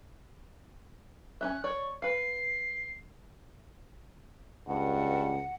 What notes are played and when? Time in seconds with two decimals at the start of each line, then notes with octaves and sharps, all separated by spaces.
1.41 C#4 D#4 E5 F#6
1.64 C#5 D5 C#6
2.02 B4 F5 C7
4.68 C#2 G2 F#5